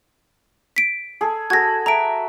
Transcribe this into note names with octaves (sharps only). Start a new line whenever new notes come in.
B6 D7
G#4 A4
F#4 G#4 A4 G#6 A#6
A4 E5 A#5 D7